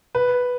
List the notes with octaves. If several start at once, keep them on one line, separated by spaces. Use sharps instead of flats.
B4